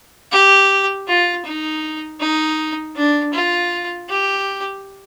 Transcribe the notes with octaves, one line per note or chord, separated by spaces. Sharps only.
G4
F4
D#4
D#4
D4
F4
G4